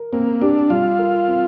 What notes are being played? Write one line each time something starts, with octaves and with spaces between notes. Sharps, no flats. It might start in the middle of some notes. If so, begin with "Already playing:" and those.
Already playing: A#4
A#3 C4
D4 G4
G3 F4
A#4
C4